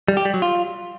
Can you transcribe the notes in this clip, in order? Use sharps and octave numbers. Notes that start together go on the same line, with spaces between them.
G3
G4
G3
F#3
F4